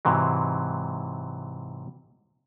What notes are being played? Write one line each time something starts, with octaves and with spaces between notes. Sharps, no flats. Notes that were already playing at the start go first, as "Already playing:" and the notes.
G#2 C3 E3 F#3